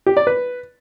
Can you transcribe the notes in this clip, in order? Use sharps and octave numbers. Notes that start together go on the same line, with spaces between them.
G4
D5
B4